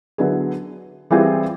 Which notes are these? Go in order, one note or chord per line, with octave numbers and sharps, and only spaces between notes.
D3 F#3 B3 E4 G#4
E3 G3 C4 F4 G#4